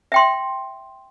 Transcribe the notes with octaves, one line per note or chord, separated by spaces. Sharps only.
E5 G5 C6